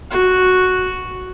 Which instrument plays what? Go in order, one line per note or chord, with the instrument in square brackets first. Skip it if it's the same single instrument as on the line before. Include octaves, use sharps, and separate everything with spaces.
[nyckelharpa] F#4